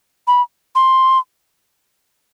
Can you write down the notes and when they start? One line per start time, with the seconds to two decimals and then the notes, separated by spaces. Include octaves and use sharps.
0.27 B5
0.75 C6